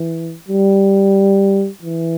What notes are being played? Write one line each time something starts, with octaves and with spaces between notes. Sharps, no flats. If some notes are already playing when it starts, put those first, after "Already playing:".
Already playing: E3
G3
E3